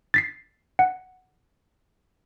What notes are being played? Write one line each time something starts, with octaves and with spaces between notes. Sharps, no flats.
A6 B6 C7
F#5